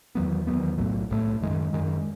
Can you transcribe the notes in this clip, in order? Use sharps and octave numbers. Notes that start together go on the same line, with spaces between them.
E2 D#3 F#3 B3
E2 D#3 F#3 B3
B1 A2 F#3 A3
B1 A2 F#3 A3
F#2 D#3 G#3
F#2 D#3 G#3